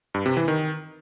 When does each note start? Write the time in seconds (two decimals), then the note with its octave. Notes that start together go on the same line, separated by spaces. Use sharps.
0.14 G2
0.26 C3
0.37 E3
0.48 D#3